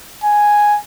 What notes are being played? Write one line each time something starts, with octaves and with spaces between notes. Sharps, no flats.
G#5